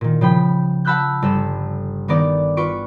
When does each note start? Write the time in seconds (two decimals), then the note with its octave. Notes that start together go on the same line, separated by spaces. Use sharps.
0.01 A#2 D#3
0.21 C#3 F3 G5 B5
0.85 F#5 A5 B5 E6 F#6 G6
1.22 G1 A4 E7
2.08 D#3 B3 D#4 D5
2.57 F4 B4 C#6 D7